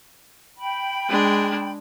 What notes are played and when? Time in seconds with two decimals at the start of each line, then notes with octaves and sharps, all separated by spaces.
0.58 G5 B5
1.09 G#3 D4